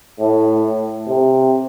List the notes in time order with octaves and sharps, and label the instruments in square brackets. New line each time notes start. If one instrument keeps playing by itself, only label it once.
[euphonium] A2
C3